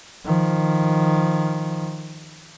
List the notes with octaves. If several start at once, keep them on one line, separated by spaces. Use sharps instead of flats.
D#3 F3